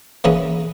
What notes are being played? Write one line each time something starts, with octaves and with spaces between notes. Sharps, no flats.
E3 A#3 C#4 G#4 B4